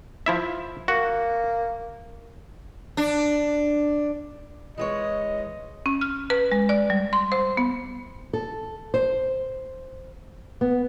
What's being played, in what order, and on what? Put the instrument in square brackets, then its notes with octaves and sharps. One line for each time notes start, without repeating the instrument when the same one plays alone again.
[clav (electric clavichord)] F3 E4 E5
[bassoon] A#3 [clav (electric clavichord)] F#4
[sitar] D4
[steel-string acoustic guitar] E3 G#3 C#5 [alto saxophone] D#5
[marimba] C#4
F6
B4
G#3
D5
G3
C6
C5
B3
[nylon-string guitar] A4
C5
B3